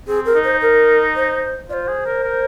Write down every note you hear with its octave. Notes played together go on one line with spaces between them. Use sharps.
C4 G#4
A#4
D#4
C5
A#4
C5
F4 C5 D5
G#4
A#4
A#4